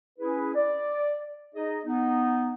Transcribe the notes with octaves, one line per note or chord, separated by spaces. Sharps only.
C#4 E4 G#4 B4
D5
D#4 G#4 D#5
B3 D#4